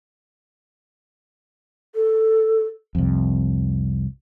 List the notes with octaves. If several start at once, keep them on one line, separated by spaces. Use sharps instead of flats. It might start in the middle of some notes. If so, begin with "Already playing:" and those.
A4
C2 F2